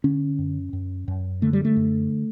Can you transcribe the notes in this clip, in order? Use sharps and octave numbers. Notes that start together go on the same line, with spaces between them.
D3 C#4
F#2
F#2
F#2
D3 A3
G3
A3
F#2